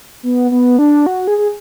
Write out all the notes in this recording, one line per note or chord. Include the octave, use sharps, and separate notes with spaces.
B3
B3
D4
F#4
G#4
G#4